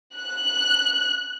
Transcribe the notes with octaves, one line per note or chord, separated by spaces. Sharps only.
F#6